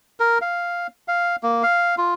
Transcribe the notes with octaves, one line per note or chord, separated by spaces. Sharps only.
A#4
F5
F5
A#3
F5
F4